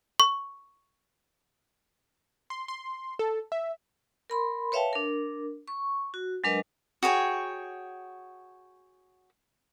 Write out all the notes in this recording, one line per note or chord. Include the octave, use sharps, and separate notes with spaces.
C#6
C6
C6
A4
E5
A#4 B5 C6
B4 C#5 E5 F5 G5 A5
D4 A#4
C#6
F#4
F#3 G#3 D4 A#4 B4 D#5
F#4 G#4 C#5 G5